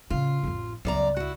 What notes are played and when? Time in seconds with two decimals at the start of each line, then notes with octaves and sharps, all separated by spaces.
0.10 A2 C#3 F4
0.43 A1 F2
0.85 C#2 F#2 B3 D5 A#5
1.17 E4 F#4